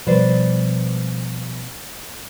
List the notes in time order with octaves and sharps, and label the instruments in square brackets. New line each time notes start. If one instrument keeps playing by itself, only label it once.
[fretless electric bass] B2 F3 G3 [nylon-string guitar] B4 C5 D5